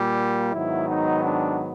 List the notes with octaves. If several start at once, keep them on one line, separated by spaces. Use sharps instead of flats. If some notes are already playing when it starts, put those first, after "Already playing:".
Already playing: A#2 G3 A#3
G#2 D#3 F#3 B3 E4
D#4
D4